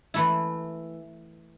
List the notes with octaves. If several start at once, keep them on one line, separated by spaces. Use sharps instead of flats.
E3 A3 E4